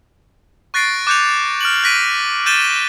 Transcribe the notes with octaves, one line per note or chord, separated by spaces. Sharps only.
C#6 F#6 A6 A#6 C7 D7
D6 F#6 G6 C#7 F7
F6 D7 F#7
F6 F#6 A#6 B6 D7 D#7
F6 G6 A6 D#7 E7 G7